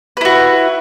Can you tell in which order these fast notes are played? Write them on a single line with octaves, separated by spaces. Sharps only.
B4 E4 F#4